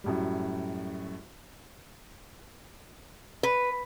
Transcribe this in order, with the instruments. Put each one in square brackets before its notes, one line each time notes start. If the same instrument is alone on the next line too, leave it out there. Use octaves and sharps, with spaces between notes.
[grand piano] F#2 A2 G3
[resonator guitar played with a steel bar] B4